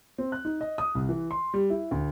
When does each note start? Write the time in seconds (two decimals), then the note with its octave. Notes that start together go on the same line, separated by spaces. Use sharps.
0.18 C4
0.32 F#6
0.45 D#4
0.61 D#5
0.78 D#6
0.95 C2
1.09 E3
1.31 C6
1.54 G3
1.70 E4
1.91 D2